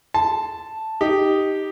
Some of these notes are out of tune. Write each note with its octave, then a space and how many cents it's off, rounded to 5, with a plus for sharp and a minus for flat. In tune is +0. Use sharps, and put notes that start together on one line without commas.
A5 +0 C6 -25
D#4 +0 G4 +0